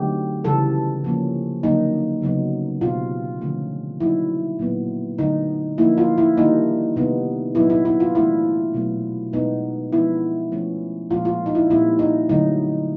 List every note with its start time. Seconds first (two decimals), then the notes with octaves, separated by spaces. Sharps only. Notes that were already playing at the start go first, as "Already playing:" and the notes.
Already playing: D3 F#3 A3 C4 D#4 G4
0.44 C#3 E3 G3 A4
1.04 F3 A#3 C#4
1.63 D3 F#3 A#3 D#4
2.22 C#3 F#3 B3 D#4
2.81 B2 G3 C4 F4
3.41 D3 F3 A3 C#4
4.00 F#3 A#3 D#4 E4
4.59 A#2 F#3 B3
5.18 D3 F#3 A3 D#4
5.78 F3 A#3 D#4 E4
5.98 F4
6.18 E4
6.37 D#3 G3 A#3 D4 D#4
6.96 C3 D#3 G3 B3 D#4
7.55 A#2 F#3 B3 D#4 E4
7.70 E4
7.85 E4
8.00 F4
8.15 E3 A3 D4 E4
8.74 B2 F#3 A3
9.33 B2 G#3 B3 D#4
9.92 F3 G#3 B3 D4 E4
10.52 F3 A3 C#4
11.10 A#2 F3 G#3 F4
11.25 F4
11.46 D#4
11.55 E4
11.70 A#2 G3 C4 E4
11.99 D#4
12.29 D3 F#3 A3 D#4